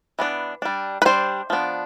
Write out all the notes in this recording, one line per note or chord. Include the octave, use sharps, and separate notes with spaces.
E3 B3 D4
G3 D4
B4
G3 D4 C5
F3 B3 D4